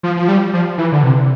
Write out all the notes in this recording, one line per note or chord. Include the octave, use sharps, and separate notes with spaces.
F3
F3
G3
F3
E3
D3
C3